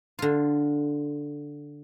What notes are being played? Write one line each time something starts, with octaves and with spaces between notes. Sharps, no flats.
D3 F4